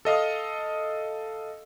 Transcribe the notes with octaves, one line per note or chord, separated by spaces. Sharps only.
A4 D#5 F5 D#6